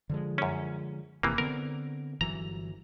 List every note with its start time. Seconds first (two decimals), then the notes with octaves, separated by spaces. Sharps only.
0.09 D3 F3 G#3
0.38 F#2 C#4
1.23 F1 C3 E3 A#3
1.38 D3 B3 C4 A#4
2.21 G1 E3 F#3 A#5